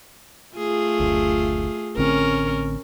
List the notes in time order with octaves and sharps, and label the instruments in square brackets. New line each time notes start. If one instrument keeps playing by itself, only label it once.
[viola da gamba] A3 F4 G#4
[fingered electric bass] F#1 D2
[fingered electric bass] A1 D3 C4 [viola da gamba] C#4 A#4